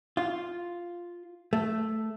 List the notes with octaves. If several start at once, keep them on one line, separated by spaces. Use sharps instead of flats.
F4
A3